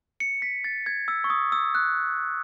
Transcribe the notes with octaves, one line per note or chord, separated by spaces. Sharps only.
C#7
B6
A6
G#6
E6
C#6
D#6
E6
F#6